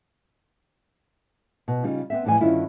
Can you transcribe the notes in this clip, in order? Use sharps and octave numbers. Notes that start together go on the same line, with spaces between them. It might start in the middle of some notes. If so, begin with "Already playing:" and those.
B2
C#3 G3 D#4 F4
B3 C4 E5
F2 A2 E3 G3 G#5
G2 D3 D#3 C#4 E4 F4